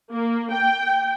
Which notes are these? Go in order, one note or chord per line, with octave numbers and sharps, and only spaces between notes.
A#3
G5